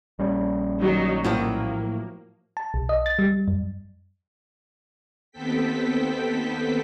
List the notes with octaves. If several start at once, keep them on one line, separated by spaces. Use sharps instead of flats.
A#1 G3 C#4
D#3 F#3 D#4
A2 F3 F#3 A#3
A5
B1
D#5
A6
G3
F#2
D#2 B3 C4 A4 G5 B6